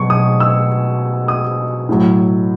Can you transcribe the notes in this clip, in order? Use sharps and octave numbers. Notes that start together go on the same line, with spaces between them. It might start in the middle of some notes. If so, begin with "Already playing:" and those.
Already playing: B2 F#3 C#6
D#6
E6
D#6
A2 F#3